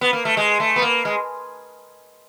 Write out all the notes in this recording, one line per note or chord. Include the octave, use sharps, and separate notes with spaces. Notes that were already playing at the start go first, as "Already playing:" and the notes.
B3
A#3
A3
G#3
A3
B3
A#3
G#3